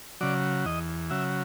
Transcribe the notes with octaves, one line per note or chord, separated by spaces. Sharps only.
C#3 F#3 D5
E2 D#5
C#3 F#3 E5